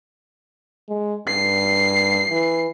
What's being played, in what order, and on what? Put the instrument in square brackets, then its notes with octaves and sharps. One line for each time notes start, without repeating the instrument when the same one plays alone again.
[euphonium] G#3
[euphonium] G2 [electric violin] C7
[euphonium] E3